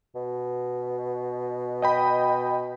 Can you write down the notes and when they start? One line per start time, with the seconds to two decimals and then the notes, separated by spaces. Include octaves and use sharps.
0.15 B2
1.82 D#5 G5 B5